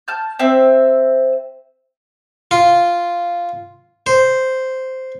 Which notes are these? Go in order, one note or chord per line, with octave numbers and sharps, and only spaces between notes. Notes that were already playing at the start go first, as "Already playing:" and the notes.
A5 F6 G6
C4 C5 E5
F4
C5